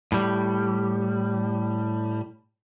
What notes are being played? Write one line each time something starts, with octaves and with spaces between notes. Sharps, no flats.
A2 G3